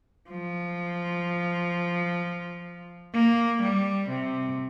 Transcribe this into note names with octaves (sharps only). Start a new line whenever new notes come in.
F3
A#3
G3
C3